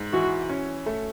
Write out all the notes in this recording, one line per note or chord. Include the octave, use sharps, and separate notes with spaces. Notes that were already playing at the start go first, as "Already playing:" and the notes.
Already playing: G#2
E3 F#4
C#4
A3